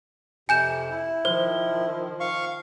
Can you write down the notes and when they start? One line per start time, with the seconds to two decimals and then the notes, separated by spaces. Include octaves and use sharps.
0.49 F2 C3 G#5 G6 E7
0.90 E4
1.25 D#3 F3 C5
2.20 F5 C#6